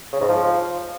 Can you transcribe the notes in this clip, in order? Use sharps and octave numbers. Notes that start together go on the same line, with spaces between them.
C#3
G#2
F3